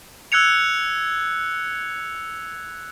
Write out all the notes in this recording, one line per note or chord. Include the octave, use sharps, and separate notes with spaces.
E6 F#6 G#6 C#7 F7